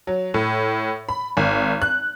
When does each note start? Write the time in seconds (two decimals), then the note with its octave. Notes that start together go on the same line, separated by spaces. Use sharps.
0.07 F#3
0.34 A2
1.09 B5
1.37 G#1
1.82 F#6